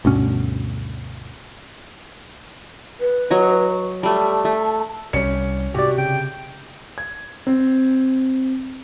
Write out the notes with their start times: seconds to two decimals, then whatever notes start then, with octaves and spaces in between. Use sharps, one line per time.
0.05 D2 G2 B2 C#4
3.00 B4
3.30 F#3 C#5 D#5
4.03 G3 A3 A5
4.45 A3
5.13 C2 G3 C#4 C#7
5.74 G#2 C3 F#4 G4 D5
5.98 C#3 G5
6.98 G#6
7.47 C4